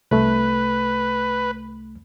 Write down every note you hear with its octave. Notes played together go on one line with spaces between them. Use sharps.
C2 A3 B4